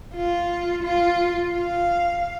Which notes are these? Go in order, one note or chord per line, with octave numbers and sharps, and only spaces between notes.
F4
F4
F5